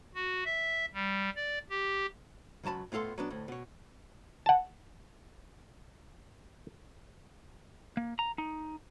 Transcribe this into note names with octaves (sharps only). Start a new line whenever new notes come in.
F#4
E5
G3
D5
G4
C#2 F#2 F#3 A5 B5
A2 B3 F4 A4 C6
F#3 B3 D4
D2 A2
B2 C#5
F#5 A5
A#3
A#5
D#4